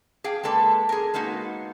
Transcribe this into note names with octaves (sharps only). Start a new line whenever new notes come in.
G#4 F5 G5
G#3 A#3 A4 B4
G#4 A#4
G#3 A#3 B3 D#4 F#4